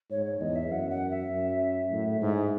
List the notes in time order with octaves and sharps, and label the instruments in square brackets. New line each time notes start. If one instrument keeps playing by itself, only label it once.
[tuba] G#2 [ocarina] C#5
[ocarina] C#5
[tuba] E2 [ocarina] D#5
[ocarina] E5
[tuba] F#2 [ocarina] F#5
[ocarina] F#5
E5
[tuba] F#2
A2
G#2